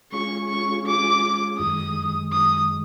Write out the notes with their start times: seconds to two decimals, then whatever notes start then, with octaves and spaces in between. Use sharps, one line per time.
0.12 G#3 C#4 F4 G#4 C#6
0.49 C#6
0.86 D6
1.59 F#2 D#3 G#3 D#6
2.32 D#6